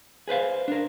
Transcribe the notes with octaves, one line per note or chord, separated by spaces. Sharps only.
G#4 B4 C5 F5
D4 A#4